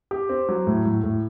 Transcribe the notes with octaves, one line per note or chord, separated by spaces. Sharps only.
G4
C4
F#3
A2
A2
A2